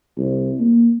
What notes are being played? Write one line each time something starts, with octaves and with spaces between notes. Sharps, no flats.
C2
A#3